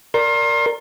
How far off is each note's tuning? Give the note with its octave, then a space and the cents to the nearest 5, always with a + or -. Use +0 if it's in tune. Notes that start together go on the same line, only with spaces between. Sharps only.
A#4 +0 D5 -5 C6 +30